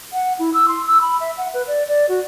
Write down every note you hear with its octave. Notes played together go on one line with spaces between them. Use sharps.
F#5
E4
E6
C6
E6
B5
E5
F#5
B4
D5
D5
F#4